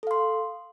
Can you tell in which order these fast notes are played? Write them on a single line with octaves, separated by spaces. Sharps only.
A4 F5 C6